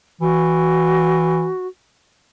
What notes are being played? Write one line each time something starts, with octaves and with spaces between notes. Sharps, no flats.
E3 F#4